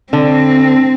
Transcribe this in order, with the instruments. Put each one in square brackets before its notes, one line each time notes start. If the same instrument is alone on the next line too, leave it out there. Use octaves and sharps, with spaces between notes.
[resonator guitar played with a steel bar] D3 [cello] C4